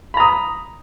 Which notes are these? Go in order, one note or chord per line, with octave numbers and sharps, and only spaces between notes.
A#5 B5 D#6